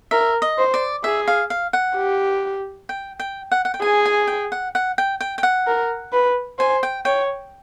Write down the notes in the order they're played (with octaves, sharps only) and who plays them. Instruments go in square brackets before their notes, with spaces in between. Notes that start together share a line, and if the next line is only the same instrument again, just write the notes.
[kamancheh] A#4 [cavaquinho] E5
[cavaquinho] D#5
[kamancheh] C5
[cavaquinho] D5
[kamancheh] G#4 [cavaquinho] E5
[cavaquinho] F5
F5
F#5
[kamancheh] G4
[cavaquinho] G5
G5
F#5
F#5
G5
[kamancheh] G#4 [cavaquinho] G#5
[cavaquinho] G#5
G5
F#5
F#5
G5
G5
G5
F#5
[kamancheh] A#4
B4
[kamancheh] C5 [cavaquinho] G#5
[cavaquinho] G5
[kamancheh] C#5 [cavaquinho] G5